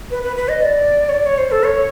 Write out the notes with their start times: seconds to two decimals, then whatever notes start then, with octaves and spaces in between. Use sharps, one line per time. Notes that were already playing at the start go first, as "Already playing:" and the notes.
0.11 B4
0.23 B4
0.36 B4
0.49 D#5
0.62 D5
1.09 C#5
1.13 D5
1.26 C#5
1.38 C5
1.52 A4
1.64 C#5